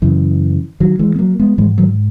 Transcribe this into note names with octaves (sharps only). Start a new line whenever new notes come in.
F#2 C#3 E3
D#3 F#3
E3 G#3
B3
F#3 A#3
G#3 B3
G#2 E3 G#3
D#3 F#3